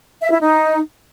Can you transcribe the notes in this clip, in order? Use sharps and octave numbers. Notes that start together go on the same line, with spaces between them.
E5
E4
D#4